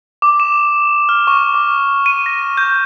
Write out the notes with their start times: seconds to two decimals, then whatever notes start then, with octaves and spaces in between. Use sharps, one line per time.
0.22 D6
0.40 E7
1.09 F6
1.27 C#6
1.54 D6
2.06 D#7
2.26 A#6
2.57 G6